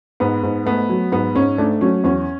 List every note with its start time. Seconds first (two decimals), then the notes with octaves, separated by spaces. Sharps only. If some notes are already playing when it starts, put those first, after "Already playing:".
0.20 G#2 B3
0.43 G#2
0.65 A3 B3
0.89 F#3
1.12 G#2 B3
1.35 G#2 C#4
1.58 A3 D4
1.81 F#3 C#4
2.04 E2 C#4